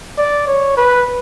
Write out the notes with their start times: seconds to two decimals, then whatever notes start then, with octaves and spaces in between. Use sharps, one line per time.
0.18 D5
0.47 C#5
0.77 B4